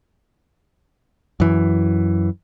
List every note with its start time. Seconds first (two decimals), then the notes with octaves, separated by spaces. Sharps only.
1.40 F#2 E3